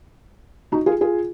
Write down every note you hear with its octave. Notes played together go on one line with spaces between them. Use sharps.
D#4 F#4
F4 G#4
F4 G#4